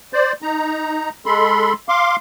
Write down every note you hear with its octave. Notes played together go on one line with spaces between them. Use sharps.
C5 D5
D#4 A#5
G#3 A4 B5 C6
F5 C6 D6